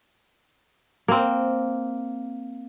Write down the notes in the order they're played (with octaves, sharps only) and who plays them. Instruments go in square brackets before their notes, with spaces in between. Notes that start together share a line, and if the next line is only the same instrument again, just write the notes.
[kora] A#3 C4